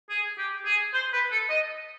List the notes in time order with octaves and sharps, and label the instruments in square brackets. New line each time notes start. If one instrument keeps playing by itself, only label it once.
[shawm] G#4
G4
G#4
C5
B4
A4
D#5